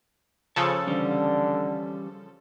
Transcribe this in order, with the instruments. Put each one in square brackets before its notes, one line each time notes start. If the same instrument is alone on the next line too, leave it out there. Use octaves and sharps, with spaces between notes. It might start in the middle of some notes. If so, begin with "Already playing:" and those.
[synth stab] C#3 F3 A4 [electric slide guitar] C#5
[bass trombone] D3 [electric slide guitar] E3 G3 C#4